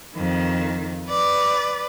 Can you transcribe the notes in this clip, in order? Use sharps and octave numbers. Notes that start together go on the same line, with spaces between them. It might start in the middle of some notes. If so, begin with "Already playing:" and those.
F2 D#3
B4 D5